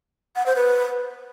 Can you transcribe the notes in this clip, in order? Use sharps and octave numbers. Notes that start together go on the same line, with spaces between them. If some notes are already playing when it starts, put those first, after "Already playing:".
F#5
C5
B4